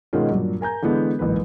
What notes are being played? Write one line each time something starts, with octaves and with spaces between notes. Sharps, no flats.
B2 D#3 G#3 C#4 F4
G2 A#2 F#3
A#4 G#5 A#5 G6
D3 E3 G#3 B3
D1 A1 G#2 A#3 B4